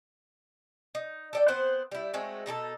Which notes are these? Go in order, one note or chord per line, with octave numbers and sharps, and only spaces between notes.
D#4
A4 D5 G5
B3 C4 C5 F#5
G3 E4
G#3 A3 C4 F#4
B2 D#4 G4 A4